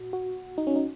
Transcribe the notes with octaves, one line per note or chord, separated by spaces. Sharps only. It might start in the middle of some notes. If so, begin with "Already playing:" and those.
Already playing: A#2 F#4
F#4
D#4
C#4
D#4